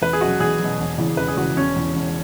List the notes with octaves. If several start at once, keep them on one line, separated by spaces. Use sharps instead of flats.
E2 B4
G#4
B2 F#3 F#4
E2 G#4
B2 F#3
E1
E2 C#3 E3
E1 B4
G#4
E2 C#3 E3 F#4
E1 C#4
E2 E3
E1